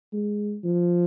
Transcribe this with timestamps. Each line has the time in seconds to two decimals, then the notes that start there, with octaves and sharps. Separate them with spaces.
0.13 G#3
0.64 F3